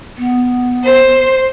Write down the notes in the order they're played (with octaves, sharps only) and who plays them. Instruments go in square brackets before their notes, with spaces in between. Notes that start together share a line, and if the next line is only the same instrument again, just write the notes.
[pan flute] B3
[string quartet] C5